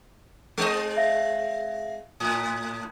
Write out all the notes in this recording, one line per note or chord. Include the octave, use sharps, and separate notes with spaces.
G#3 C4 D#5
E5 F5 A#6
A2 D#6